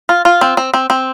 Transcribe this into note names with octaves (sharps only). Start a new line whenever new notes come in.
F4
F4
C4
C4
C4
C4